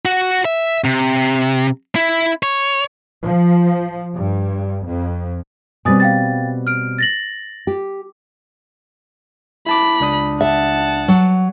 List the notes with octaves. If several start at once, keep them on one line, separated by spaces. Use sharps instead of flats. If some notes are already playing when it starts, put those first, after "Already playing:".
F#4
E5
C3
E4
C#5
F3
G2
F2
B2 G3 C4 G#5 D#6 A6
F5 G5 A6
F6 D7
A6 A#6 F#7
G4
E4 A5 B5 D6
C#2 D4 D#6
E5 F#5 A5
F#3